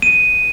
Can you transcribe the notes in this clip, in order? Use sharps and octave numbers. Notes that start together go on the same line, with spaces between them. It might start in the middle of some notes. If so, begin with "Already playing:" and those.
D#7